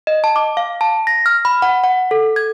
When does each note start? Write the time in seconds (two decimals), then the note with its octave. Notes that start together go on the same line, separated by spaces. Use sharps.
0.07 D#5
0.24 A5
0.36 D6
0.57 F5
0.81 A5
1.07 A#6
1.26 F6
1.45 B5
1.62 F#5
1.84 F#5
2.11 A4
2.36 G#6